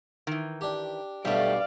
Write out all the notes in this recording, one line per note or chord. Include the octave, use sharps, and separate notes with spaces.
D#3 E3
D4 G4
B1 G2 B2 G3 A3 D5 F5